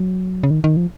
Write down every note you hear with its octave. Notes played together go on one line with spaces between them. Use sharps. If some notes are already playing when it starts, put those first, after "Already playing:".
Already playing: F#3
C#3
D#3
D#3
F3